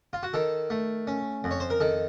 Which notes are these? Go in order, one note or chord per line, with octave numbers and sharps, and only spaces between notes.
F4
F#4
D#3 A4
A3
C#4
F2
C#5
C5
A#4
D#3 A4